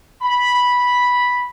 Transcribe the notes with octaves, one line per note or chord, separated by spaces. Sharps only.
B5